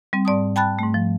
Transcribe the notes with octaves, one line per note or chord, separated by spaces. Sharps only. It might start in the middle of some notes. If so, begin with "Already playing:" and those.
G3 C4
G#2 D5 A5 D#6
G5 A5 B5 F#6 A6
G#2 A3
F3